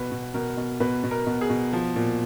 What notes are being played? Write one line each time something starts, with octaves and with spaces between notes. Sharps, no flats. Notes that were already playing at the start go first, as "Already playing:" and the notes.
Already playing: B2 B4
B2
B2 A#4
B2
B2 B4
B2
A#4
B2
G#4
B2
F3
A#2